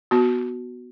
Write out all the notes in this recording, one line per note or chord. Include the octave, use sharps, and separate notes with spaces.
B3 F#4